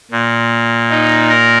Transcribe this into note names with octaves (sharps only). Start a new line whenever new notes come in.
A#2
D#4
A#4